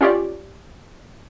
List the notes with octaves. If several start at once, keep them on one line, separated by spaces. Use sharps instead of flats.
C#4 F4 G4 C#5 D5